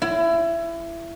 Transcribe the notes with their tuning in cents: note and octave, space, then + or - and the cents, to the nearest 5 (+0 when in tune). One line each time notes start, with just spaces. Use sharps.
E4 +25